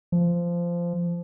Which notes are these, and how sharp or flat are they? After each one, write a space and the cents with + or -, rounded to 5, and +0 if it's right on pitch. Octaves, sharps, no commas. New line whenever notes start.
F3 -15